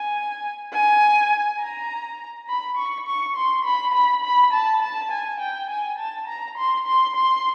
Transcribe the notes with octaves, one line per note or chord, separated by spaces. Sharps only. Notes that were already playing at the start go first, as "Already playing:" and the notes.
Already playing: G#5
G#5
A#5
B5
C#6
C#6
C6
B5
B5
B5
A5
A5
G#5
G5
G#5
A5
A#5
C6
C6
C6